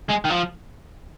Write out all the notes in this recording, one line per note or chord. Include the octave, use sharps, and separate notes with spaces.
G#3
D#3
F3